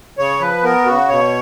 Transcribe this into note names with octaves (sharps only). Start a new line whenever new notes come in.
C#3 C#5
F3 B4
B3 A#4
C#3 F#4
B2 C#5